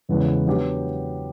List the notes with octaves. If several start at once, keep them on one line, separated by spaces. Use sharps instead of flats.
E2 C#3 E3 G#3 B3
F#3 B3 D4 G4